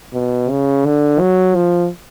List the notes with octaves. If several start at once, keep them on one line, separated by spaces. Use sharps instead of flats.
B2
C#3
D3
F#3
F3